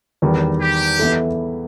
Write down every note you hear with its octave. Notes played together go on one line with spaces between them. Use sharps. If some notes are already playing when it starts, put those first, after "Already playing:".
E2 D#3 G3
G4
E3 B3 E4 A4